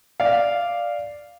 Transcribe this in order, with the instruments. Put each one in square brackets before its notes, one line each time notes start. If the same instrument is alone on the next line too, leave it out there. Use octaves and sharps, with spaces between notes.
[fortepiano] D5 F5